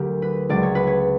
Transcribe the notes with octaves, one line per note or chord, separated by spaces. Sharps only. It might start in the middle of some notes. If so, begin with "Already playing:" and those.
Already playing: D2 D3 F#3 G4 A#4
B4
C#2 C#3 F#3 D5
C#5
B4
C#5